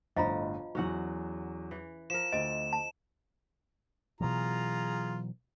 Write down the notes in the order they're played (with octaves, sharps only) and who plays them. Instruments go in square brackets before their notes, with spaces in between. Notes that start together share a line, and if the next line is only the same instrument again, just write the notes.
[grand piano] G1 A2 [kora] F3 [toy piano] D#5 A#5 B5
[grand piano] E2 F#3 [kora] C#4 F#4 F#5
[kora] E3
[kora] F3 A#4 [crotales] E7
[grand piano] D2 D7 [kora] C4 [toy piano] D#5
[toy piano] A5
[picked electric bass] B2 E3 F#3 [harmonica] F4 G#4 A#5